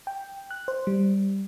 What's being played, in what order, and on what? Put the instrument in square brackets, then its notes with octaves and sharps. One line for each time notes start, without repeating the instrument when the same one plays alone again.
[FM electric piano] G5
F#6
C5
G3